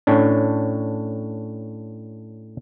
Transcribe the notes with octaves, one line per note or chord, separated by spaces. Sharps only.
A2 C#4 D4